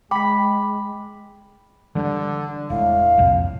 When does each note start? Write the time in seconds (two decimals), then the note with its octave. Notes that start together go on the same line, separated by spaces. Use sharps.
0.11 G#3 G5 B5 D6 B6
1.95 D3 E3 G3
2.70 E1 A2 F5
3.18 C2 F2 A#2